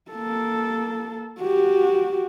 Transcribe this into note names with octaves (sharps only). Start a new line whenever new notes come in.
A#3 A4
F#4 G4